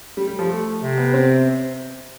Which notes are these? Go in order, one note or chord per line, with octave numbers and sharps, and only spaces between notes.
G3
G3
F3
A3
C3
B3
C4